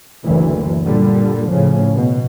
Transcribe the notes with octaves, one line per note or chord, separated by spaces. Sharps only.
F#1 D2 E3
A#2 D3 G3
A2 C#3 F3
B2